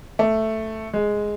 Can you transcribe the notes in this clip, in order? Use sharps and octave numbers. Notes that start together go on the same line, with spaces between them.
A3
G#3